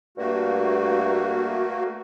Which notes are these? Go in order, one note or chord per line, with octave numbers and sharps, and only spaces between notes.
G2 A3 A#3 F#4